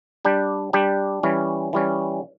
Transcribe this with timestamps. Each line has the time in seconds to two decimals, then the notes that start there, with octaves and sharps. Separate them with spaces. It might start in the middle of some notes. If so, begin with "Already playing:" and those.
0.25 G3 D4 G4
0.73 G3 D4 G4
1.23 E3 G3 C#4
1.73 E3 G3 C#4